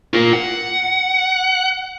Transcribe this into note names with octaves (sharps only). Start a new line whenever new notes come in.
F4 A#4
F#5